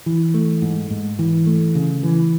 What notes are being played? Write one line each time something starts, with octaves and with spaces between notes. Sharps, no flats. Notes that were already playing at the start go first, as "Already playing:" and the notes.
E3
A3
G#2
G#2
E3
A3
C#3
E3